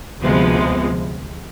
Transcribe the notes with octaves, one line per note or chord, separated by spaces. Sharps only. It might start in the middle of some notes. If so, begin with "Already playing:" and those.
D2 C3 F3 G#3 B3